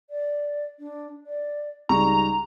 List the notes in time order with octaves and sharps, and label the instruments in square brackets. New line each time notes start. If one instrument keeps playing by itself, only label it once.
[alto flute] D5
D4
D5
[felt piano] C#2 G3 C#6 [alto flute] D#4 [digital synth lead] A#5